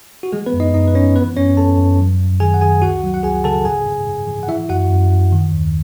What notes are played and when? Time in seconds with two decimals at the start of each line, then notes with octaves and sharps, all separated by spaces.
0.23 F#4
0.32 E3 G#3 G#4
0.46 B3 B4
0.53 F#2
0.60 D#4 D#5
0.74 F#2 D#4 D#5
0.88 B4
0.95 E3 C#4 C#5
1.15 E3 B3 B4
1.37 F#2 C#4 C#5
1.57 F#2 A4 A5
1.78 F#2
1.99 F#3
2.20 F#2
2.40 D#3 G#4 G#5
2.54 F#5
2.61 D#3 G#4 G#5
2.82 C#2 F#4 F#5
3.03 F#3
3.14 F#5
3.23 C#2 G#4 G#5
3.44 C#3 A4 A5
3.65 G#2 G#4 G#5
3.87 G#2
4.07 G#2
4.27 E3
4.43 F#5
4.48 E3 E4 E5
4.69 F#2 F#4 F#5
4.90 F#2
5.11 F#2
5.32 D#3
5.52 D#2